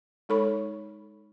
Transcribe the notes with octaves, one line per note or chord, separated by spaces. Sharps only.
G#3 D#4 A4 C#5 B5 C#6